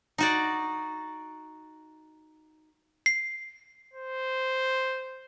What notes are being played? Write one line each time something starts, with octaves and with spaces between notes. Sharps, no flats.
D#4 F#4 D5
C7
C5